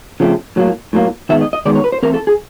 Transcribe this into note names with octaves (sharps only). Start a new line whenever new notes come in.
C#3 F3 A3 C4
A2 F#3 A#3
A2 F#3 A#3
D#3 G#3 B3 E5
D#5
D#5
D#3 G#3 B3 D5
C#5
B4
C5
E3 A3 C4 A#4
A4
G#4